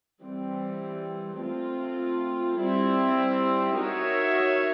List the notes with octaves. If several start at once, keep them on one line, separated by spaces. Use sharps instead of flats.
E3 G3 C4
A3 C4 F4
G3 C4 E4
D#4 F#4 A#4 C#5 E5